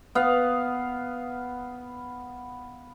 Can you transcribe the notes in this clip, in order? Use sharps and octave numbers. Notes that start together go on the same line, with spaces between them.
B3 F5